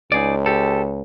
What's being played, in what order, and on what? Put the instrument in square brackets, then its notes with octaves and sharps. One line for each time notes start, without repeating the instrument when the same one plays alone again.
[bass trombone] C#2 [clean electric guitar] D#4 G#4 D5
[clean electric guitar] G4 A4